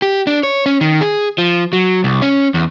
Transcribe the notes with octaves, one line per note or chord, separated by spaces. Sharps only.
G4
D4
C#5
C#4
D#3
G#4
F3
F#3
C2
C#4
E2